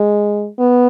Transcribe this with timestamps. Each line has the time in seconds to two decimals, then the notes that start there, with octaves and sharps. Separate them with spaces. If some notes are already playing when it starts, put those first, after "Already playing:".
Already playing: G#3
0.59 B3